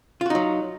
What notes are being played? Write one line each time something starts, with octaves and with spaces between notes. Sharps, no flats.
F#3 D#4 F4 F#4